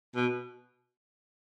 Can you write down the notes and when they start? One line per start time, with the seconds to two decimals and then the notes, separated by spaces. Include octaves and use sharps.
0.15 B2